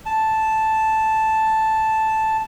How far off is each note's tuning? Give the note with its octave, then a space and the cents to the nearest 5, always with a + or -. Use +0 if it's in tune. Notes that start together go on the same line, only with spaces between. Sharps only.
A5 -5